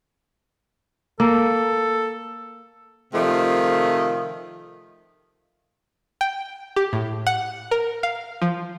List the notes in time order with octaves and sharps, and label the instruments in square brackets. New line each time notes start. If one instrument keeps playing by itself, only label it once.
[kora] A#3 [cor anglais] A4
[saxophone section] C3 D#3 F3 A3
[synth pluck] G5
G4
A2
F#5
A#4
F5
F3